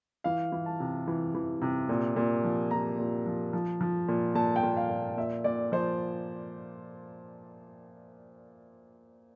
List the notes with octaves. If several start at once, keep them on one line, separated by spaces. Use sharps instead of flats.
E3 F5
E3
A5
C3
E3
E3
C3
A#2
A#2
F3
A#2 A#5
A#2
F3
F3
F3
A#2
A#2 A5
G5
A#2
F5
A#2
A#2 E5
A#2 D5
F3 C5